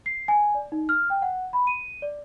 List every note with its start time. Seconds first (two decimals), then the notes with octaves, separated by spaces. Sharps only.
0.06 C7
0.28 G#5
0.55 D5
0.72 D#4
0.89 F6
1.10 G5
1.22 F#5
1.53 B5
1.67 D#7
2.02 D5